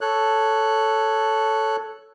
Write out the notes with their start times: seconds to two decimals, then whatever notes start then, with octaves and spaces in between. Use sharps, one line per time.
0.01 A4 C#5 F#6